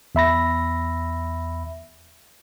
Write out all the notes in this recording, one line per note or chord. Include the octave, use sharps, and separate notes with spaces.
E2 E5 B5 A#6